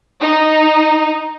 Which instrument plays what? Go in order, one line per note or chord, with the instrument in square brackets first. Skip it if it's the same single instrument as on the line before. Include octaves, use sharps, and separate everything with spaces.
[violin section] D#4